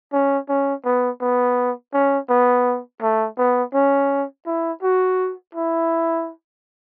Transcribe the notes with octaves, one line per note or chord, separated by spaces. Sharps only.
C#4
C#4
B3
B3
C#4
B3
A3
B3
C#4
E4
F#4
E4